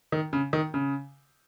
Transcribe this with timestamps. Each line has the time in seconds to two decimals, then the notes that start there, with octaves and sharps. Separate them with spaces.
0.12 D#3
0.33 C#3
0.53 D#3
0.74 C#3